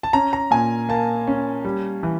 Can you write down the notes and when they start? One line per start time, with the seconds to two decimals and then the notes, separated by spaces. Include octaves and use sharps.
0.03 A5
0.13 C#4 A#5
0.33 A#5
0.51 A#2 G#5
0.89 A#3 A5
1.27 C#4
1.65 G3
2.03 E3